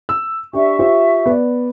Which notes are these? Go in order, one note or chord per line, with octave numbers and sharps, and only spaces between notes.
E6
D4 G4 E5 C#6
F4 G4 C5
B3 D5